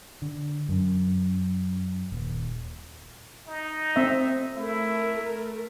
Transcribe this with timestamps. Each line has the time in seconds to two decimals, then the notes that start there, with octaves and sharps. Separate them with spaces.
0.22 D3
0.69 F#2
2.12 D#1
3.47 D#4
3.96 C4 E5
4.56 A3 E4 A#4